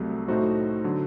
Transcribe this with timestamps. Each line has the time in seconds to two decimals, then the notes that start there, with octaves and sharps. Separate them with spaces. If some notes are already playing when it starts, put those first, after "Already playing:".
Already playing: C2 C3 F#3 A3
0.28 A2 A3 D#4 F#4 C5
0.84 D3 F#3